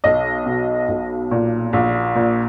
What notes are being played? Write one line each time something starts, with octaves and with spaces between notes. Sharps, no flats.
B1 D#5
B2
B1
A#2
A#1
A#2